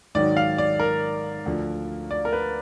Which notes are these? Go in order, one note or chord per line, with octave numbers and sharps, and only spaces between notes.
G#2 D#3 F#3 D5
F5
D5
A#4
D2 D3 F3
D5
A#4
B4